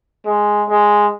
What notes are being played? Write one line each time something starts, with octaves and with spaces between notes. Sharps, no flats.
G#3
G#3